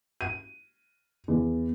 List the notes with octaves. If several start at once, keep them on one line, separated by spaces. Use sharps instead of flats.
D#7
E2